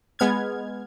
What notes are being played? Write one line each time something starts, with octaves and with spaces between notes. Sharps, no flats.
G#3 B3 F6 G#6